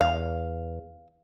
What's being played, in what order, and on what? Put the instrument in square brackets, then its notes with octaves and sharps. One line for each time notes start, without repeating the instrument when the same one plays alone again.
[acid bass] E2 [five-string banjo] F5